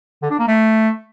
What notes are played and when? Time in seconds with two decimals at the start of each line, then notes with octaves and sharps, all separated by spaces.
0.22 D3
0.31 D4
0.39 A#3
0.47 A3